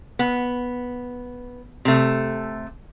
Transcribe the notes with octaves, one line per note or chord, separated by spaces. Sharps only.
B3
C3 A3